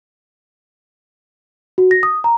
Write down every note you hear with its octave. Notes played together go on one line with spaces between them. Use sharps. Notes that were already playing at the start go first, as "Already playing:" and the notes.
F#4
A#6
D#6
A#5